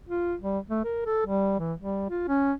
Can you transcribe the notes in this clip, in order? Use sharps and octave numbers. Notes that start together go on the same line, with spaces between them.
F4
G3
A3
A#4
A4
G3
E3
G3
F4
C#4